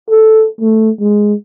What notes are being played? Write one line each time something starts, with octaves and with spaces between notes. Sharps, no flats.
A4
A3
G#3